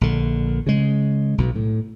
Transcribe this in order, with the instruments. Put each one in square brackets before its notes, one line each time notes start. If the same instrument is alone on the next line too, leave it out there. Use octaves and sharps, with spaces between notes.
[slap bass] A#1 D3
C#3 G#3
B1 B2
A2